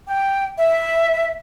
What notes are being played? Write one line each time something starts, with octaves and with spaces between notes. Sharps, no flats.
G5
E5